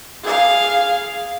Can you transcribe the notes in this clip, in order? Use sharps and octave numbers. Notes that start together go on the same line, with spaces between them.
G#4 F5